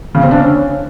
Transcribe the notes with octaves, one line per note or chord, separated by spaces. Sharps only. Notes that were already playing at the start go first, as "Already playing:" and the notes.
C#3
C4
D4
C#4